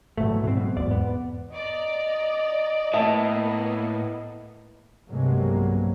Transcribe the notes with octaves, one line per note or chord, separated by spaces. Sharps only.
D2 G#2 B2 E3 F#3 A3
G#2 B2 C4
F#2 B2
E2 G#2 D5
B3
D5 D#5 A#5
A2 A#3 B3 E5 A5 D#6
B1 G2 C3 F#3 G#3 A#3